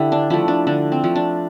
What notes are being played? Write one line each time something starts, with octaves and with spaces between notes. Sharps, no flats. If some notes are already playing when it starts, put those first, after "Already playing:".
Already playing: D3 E4 G4
D4
F3 A3 E4
D4
D3 D4
C4
F3 A3
D4